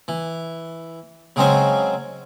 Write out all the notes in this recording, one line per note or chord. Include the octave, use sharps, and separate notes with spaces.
E3
C#3 F#3 G#3 C4 C#4 C5